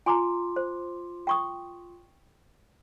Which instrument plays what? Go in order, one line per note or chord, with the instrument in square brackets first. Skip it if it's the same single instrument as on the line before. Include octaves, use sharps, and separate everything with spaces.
[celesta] F4 C6 D6 [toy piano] G#5 A#5
[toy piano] C5
G5 C#6 D#6